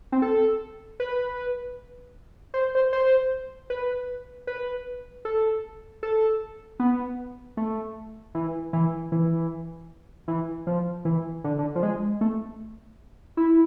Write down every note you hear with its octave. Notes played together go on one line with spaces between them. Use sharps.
C4
A4
B4
C5
C5
C5
B4
B4
A4
A4
B3
A3
E3
E3
E3
E3
F3
E3
D3
D3
F3
G#3
A3
E4